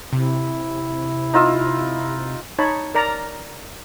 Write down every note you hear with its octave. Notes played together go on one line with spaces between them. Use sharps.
C3 E4
D#4 F4 E6
D#4 C#5 A5 B5
A#4 D5 A#5